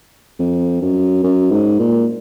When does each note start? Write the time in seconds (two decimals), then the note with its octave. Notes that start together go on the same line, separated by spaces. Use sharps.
0.39 F2
0.82 F#2
1.23 F#2
1.51 G#2
1.79 A#2